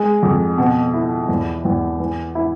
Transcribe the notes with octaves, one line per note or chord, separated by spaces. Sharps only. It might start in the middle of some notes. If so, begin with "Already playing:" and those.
Already playing: G#3
F2
B2
E4
E2
E2
E3
E4